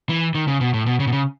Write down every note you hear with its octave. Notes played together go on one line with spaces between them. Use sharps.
E3
D#3
C#3
B2
A2
B2
C#3
B2
C#3